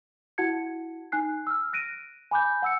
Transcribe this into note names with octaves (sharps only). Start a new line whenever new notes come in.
E4 F#4 F#5 A5 G#6 C#7
D#4 G#5 F#6 C7
E6 F6
F#6 A#6 D7 D#7
G#5 B5 D6 F#6 G6
F#5 E6 C#7